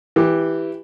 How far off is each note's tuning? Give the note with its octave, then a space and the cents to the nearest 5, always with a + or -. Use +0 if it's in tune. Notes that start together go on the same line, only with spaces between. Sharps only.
E3 +0 G4 +0